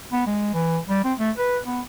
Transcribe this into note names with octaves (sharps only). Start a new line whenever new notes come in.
B3
G#3
E3
G3
C4
A3
B4
B3